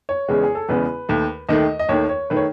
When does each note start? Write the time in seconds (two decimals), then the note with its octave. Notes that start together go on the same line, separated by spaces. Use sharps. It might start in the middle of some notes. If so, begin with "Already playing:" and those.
0.09 C#5
0.28 E2 C#3 G#3 B3
0.43 G#4
0.55 A4
0.69 E2 C#3 G#3 B3 B4
1.09 D#2 D#3 A3
1.49 D#2 D#3 A3 D#5
1.79 D#5
1.89 D#2 D#3 A3 C#5
2.09 C#5
2.30 D#3 A3 B4
2.37 C#5